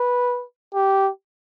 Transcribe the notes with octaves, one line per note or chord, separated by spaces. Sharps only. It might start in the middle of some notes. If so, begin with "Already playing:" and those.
Already playing: B4
G4